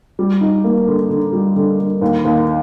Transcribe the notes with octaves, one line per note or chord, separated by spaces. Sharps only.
G3
D#4
A#3
D3
D3
G3
D3
D3
D#2
D#2